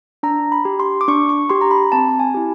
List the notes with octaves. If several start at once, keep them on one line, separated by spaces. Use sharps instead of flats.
D4 A#5
B5
G4
C6
D6
D4 C#6
C#6
G4 C6
A#5
B5
C4 A5
G#5
E4 G4